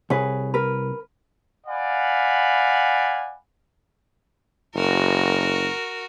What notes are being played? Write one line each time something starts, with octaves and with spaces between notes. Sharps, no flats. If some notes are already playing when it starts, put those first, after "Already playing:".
C2 G#4 B4 C#5
A#4 B4
D5 F5 F#5 G#5 B5
F#1 F#4 A#4